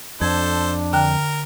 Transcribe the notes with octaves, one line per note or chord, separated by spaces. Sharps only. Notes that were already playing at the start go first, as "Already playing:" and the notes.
F2 D4 A4 C5 G#6
D3 A#4 G5 F#6